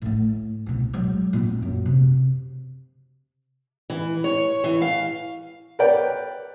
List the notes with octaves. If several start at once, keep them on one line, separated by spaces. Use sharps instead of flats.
A2 A3
C2 B2
F#3 G#3
A#2 C4
F#2
C3
E3
C#5
E3
F5
A#4 B4 C#5 D5 G5